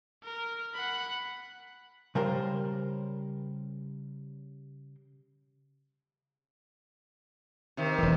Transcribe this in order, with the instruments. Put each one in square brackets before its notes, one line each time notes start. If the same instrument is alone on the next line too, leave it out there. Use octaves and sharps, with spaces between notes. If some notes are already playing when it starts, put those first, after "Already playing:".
[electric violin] A#4
F#5 B5
[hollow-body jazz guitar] C#3 G3 A#4 C5 C6
[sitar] C3 D#3
[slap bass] E1 E3